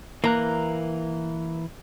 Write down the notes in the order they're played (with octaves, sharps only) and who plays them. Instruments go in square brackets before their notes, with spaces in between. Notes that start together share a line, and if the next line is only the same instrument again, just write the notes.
[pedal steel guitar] E3 A#5 F#6 [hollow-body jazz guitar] A#3